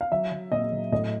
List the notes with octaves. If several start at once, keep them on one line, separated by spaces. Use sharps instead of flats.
F5
F#3 E5
F#3
A#2 D#5
F#3
A2 D#5